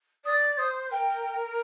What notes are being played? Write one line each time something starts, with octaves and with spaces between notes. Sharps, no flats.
D5 D#6
C5 D#6
A#4 G5